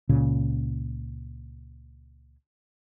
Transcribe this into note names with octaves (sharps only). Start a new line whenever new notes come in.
C#2 A#2 C#3